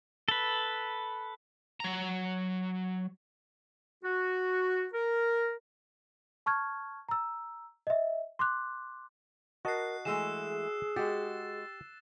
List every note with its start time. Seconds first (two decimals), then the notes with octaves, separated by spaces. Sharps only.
0.28 A4 B4
1.80 F#3 A#5
4.04 F#4
4.93 A#4
6.46 A5 C#6 F6 G#6
7.09 A#5 E6
7.87 D#5 E5
8.39 C6 D6 F#6
9.65 F#4 A#4 D#5 A5 F#6 C7
10.05 E3 G#3 A3 G#4 E6 C7 E7
10.96 G#3 F#4 G4 A6